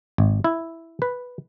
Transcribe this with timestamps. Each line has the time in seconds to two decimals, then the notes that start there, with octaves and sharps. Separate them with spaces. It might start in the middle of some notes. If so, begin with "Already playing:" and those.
0.18 G#1
0.44 E4
1.02 B4